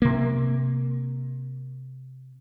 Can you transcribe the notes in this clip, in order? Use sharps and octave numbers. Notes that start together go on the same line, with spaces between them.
C3 A#3